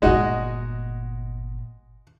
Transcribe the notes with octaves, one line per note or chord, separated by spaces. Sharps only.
G1 A#2 G#3 D#4 F#4